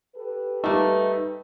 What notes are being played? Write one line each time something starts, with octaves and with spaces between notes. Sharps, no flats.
G4 A4 B4
G3 A3 A#3 D#4